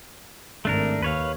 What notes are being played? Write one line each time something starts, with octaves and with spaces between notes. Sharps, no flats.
G#1 A3 D4 A#4
D#2 B4 C#5 F5